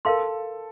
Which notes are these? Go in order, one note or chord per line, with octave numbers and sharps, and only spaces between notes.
A4 A#4 F5 C6